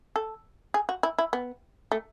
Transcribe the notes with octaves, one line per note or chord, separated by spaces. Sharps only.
A4
G#4
F#4
E4
E4
B3
A3